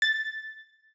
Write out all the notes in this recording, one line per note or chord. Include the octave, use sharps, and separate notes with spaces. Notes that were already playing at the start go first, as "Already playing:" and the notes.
A6